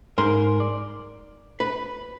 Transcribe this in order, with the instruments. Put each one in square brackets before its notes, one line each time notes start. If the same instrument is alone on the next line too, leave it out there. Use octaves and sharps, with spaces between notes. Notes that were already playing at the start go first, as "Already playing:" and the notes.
[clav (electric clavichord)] G#2 [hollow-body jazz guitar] A#4 C6
[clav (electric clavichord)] D5
[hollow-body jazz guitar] B4